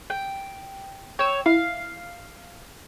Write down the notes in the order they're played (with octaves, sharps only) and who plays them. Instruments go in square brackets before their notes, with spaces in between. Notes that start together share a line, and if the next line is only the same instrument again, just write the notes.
[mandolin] G5
[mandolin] C#5 [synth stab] G5 E6
[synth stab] E4 [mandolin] F5